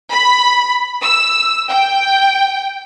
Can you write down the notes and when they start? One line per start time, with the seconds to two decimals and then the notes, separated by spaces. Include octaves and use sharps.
0.10 B5
1.01 E6
1.69 G5